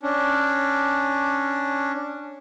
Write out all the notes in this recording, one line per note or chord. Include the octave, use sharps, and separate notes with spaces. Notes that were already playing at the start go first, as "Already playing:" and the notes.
C#4 D4